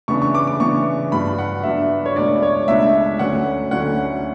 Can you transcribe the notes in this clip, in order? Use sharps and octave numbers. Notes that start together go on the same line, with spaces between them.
C#3 E3 B3 D4 C#6
C#6
D6
D6
C#3 E3 B3 D4 C#6
G2 F#3 B3 D4 B5
F#5
G2 F#3 B3 D4 E5
C#5
C#2 B2 A3 D4 D5
C#5
C#2 B2 A3 D4 E5
D2 D3 F#3 C#4 F#5
D2 D3 F#3 C#4 F#5